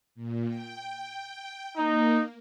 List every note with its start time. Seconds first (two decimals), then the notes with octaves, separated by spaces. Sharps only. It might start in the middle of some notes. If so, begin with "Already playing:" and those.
0.15 A#2
0.47 G5
1.77 A#3 D#4